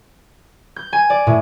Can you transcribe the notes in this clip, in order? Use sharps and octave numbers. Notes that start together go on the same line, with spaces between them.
G6
G#5
D5
A2